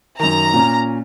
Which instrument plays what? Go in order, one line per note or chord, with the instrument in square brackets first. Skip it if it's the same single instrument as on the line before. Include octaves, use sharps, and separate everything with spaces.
[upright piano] F#2 D#3 [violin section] A#5
[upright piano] A#2 C#4